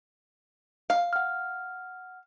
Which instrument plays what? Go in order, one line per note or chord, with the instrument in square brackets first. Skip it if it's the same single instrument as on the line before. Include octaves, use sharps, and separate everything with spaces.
[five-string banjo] F5
[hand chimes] F#5 F6